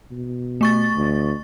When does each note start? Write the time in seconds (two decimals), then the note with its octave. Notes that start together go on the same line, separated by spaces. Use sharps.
0.11 B2
0.61 A3 C#6 A6
0.96 D2